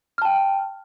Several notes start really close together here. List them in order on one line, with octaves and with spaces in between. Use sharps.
F6 A5 G5